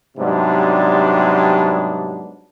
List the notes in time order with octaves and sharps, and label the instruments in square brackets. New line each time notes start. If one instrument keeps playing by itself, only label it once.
[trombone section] G#2 C3 F#3 G3 B3 D4